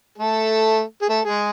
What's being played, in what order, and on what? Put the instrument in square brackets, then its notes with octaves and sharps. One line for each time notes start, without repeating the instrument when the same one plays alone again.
[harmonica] A3 A4
G#4
A3 A4
G#3 G#4